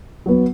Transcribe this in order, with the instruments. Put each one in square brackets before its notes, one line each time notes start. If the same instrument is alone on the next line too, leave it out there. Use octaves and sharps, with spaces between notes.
[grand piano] F#3 B3